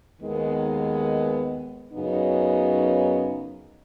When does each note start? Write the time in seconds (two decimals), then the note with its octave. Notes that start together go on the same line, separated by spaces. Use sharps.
0.21 D#2 D#3 G#3 B3
1.93 F#2 C#3 F#3 B3 D#4